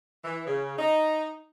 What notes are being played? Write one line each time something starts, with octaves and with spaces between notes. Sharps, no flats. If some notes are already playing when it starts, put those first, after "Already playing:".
E3
C#3
D#4